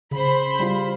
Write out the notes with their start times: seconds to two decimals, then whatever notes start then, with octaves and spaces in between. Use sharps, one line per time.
0.11 C#3 C5 B5
0.59 G3 F4